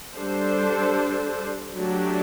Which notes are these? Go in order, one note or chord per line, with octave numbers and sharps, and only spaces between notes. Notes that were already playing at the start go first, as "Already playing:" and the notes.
G3 D4 A4 C5
F#3 A3 D4 G4